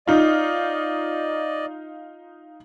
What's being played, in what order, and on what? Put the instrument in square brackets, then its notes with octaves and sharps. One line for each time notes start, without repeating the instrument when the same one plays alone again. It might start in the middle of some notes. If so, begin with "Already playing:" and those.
[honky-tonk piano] D#4 F4 [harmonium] D5 D#5